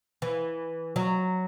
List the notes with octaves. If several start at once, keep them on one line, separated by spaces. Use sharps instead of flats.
E3
F#3